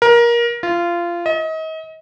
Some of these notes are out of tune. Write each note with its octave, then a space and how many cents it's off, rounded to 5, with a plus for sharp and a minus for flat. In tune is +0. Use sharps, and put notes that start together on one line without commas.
A#4 +20
F4 -20
D#5 +35